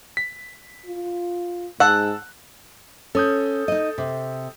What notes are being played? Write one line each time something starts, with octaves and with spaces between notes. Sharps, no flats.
B6
F4
G#2 F#5 A5 E6 F#6
C#4 A4 D#6 G6
D#4 D#5
C3